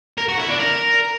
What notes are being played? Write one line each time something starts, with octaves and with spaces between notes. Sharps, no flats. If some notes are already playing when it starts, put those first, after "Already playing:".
A#4
F#4
E4
D4
A#4